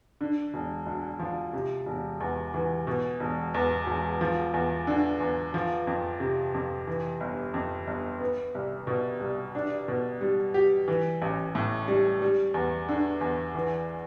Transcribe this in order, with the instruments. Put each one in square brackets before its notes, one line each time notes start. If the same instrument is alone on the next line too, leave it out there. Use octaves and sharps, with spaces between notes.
[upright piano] D3
E1
D2
F3
C3
E1
E2
E3
B2
E1
E2
E1
F3
E2
D3
E2
F3
F2
C3
F2
E3
G1
F2
G1
B3
C2
B2
C2
D4
B2
G3
G4
E3
A1
A2
G3
G3
E2
D3
E2
E3